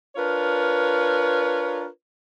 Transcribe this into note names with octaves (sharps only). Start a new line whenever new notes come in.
D4 F4 A#4 B4 C#5